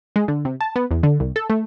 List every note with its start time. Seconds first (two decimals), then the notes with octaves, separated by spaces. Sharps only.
0.16 G#3
0.28 D3
0.45 C3
0.61 A5
0.76 B3
0.91 E2
1.03 D3
1.20 C2
1.36 A4
1.50 A3